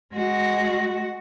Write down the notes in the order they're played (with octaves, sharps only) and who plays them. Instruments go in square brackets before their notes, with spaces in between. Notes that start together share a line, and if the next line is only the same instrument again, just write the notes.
[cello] G#3 F#4